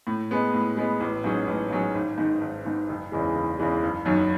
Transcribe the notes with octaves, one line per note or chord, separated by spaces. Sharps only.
A2
G#3 B3
A2
G#3 B3
A1
G#2 F#3 C#4 G#4
A1
G#2 F#3 C#4 G#4
G#1
G#2 D#3
G#1
G#2 D#3
F#1
E2 C#3 E3 G#3
F#1
E2 C#3 E3 G#3
F#1
F#2 D#3 F#3